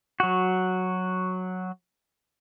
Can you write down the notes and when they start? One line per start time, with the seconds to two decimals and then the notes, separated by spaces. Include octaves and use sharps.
0.20 F#3 F#4